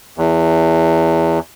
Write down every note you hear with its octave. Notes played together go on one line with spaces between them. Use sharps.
E2